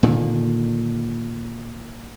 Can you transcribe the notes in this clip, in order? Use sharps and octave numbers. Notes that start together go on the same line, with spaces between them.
A#2 D3 D#3